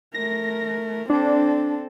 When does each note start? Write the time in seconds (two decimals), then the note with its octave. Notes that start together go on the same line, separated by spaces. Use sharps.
0.14 A3 A#4 A#6
1.10 C4 D4 A4